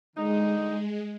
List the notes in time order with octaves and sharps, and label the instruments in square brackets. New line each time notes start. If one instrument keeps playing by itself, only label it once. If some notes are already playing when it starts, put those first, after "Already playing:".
[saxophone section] D3 D#3 D#4 [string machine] G#3